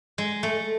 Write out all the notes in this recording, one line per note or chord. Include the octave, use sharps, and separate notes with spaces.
G#3
A3